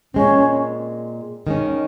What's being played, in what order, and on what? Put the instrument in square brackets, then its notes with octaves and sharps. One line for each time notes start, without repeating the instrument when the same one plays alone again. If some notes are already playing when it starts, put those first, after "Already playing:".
[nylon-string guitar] A#2 G#3 C4 [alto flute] C#4
[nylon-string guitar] D#3 G#3 C#4